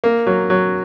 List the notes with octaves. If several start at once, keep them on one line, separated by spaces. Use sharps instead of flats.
A#3
F#3
F#3